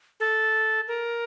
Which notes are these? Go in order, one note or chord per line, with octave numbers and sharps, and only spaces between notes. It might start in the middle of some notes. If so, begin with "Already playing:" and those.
A4
A#4